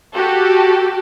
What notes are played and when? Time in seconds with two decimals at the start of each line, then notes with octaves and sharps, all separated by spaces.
0.14 F#4 G4 A4